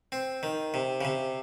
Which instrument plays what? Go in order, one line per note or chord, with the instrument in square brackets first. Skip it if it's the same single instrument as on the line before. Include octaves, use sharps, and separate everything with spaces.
[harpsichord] C4
D#3
C3
C#3
C3